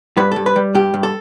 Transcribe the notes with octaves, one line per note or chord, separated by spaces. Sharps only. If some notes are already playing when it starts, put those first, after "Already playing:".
G2 B4
G2 A4
B4
G3
G2 G4
G2
A4